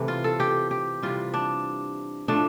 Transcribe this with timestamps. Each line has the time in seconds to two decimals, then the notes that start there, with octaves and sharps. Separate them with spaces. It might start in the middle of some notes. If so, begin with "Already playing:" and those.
Already playing: C3 E3 A3
0.08 F4
0.24 A4
0.40 G4
0.71 G4
1.03 C3 E3 G3 F4
1.34 D4
2.28 A2 F3 A3 D4